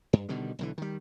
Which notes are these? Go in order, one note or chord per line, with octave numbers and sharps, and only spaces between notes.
G2
B2 D3 D#3 G3
B1 D3 E3
D#3 G3